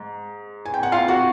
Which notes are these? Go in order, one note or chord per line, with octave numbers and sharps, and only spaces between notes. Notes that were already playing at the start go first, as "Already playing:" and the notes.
Already playing: G#2
G#5
G5
F#5
F4 F5
F#4 F#5